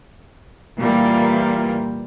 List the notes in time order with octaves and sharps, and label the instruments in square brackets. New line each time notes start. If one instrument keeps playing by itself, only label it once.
[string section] A#2 E3 G3 A#3